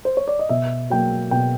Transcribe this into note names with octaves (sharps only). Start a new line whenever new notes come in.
C5
C#5
D5
D#5
B2 E5
F#3 A#3 G5
B2 G5